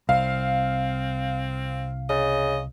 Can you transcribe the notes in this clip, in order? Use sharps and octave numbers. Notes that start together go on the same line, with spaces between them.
C2 C4 F5
C#3 D#5